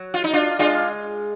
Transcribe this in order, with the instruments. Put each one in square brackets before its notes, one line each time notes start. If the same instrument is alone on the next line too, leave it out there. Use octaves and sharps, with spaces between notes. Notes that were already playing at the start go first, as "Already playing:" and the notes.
Already playing: [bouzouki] F#3
[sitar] F4
D#4
D4 F4
[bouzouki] G#3 [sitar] D4 F4